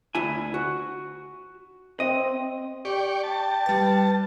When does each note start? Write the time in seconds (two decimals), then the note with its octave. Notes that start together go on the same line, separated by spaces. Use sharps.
0.15 D2 E4 G#5
0.54 F#4
2.00 C4 D#5
2.85 G4 D5 G5 C#6
3.23 G5 A5
3.66 G3 B4 A6